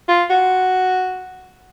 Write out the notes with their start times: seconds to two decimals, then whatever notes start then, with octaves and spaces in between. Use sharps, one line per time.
0.08 F4
0.30 F#4